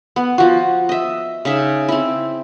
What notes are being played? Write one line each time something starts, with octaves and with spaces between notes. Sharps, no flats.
B3
F3 F#4
D#5 E5
C#3 D#4 E5
C4 E4